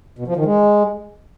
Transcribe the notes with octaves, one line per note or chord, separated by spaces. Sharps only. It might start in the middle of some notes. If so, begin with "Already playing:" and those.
B2
F3
D#3
G#3